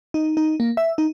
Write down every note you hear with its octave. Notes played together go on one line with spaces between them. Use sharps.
D#4
D#4
A#3
E5
D#4